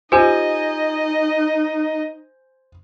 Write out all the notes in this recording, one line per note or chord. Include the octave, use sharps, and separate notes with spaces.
D#4 F4 G4 C5 D#5 G#5